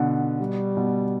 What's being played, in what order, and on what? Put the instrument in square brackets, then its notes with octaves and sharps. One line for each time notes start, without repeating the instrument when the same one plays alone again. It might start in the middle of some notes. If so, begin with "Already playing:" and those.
Already playing: [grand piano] B2 D3
[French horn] G3
[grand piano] B2